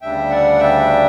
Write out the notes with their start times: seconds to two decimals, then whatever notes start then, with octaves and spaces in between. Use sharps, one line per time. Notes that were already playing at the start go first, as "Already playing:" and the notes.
0.01 D2 C#3 G3 D4 E5 G5
0.30 D5 F#5
0.59 E5 G5